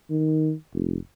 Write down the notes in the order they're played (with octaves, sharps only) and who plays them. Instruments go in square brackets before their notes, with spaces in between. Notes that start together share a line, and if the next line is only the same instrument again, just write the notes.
[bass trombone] D#3
F1